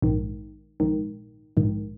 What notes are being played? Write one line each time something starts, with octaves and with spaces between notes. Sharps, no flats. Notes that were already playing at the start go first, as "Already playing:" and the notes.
A#1 G#2 D#3
A#1 G#2 D#3
A#1 G#2 D#3